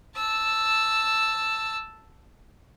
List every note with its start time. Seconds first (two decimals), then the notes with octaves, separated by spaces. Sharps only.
0.16 A5 E6